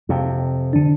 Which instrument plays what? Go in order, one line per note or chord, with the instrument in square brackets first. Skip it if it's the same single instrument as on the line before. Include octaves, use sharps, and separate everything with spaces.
[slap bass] F2 C3
[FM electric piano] D3 D4